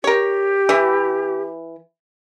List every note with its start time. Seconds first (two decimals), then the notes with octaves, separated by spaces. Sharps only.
0.04 G4 A#4 C#5
0.69 E3 E4